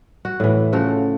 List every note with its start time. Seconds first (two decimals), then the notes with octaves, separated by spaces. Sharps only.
0.25 F#4
0.40 A2 E3
0.72 C#3 F3 F#4 A4